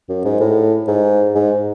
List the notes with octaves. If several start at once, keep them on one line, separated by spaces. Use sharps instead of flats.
F#2
G#2
A2
G#2
G#2